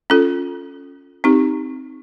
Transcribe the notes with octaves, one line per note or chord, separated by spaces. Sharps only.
C#4 F4 A4
C4 D#4 G4